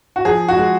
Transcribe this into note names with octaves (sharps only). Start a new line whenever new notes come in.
F#4
F3 G#4
F#4
G#3